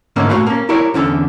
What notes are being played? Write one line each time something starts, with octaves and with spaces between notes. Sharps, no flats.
G#2 D3 A3 A#3 C#4
A#2 G#3 A3 F#4 F5 B5
A#3 C#4
E4 G4 A#4 C#5 D5
E2 D3 C#4 A4